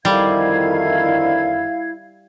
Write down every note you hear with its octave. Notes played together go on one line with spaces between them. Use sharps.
F2 D3 D#3 G3 E4 F5 G#6